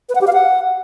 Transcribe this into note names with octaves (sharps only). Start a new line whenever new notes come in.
B4
F#5
G4
F5
F#5